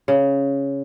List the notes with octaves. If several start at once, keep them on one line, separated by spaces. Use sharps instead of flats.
C#3